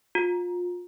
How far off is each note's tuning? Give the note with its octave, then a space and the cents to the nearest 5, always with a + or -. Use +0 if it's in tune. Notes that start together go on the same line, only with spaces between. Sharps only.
F4 +25